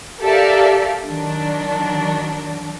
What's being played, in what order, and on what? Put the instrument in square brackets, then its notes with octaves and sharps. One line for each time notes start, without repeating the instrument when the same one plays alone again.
[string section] G4 A4 A#4 D5 E5 F5
D#3 F#3 D4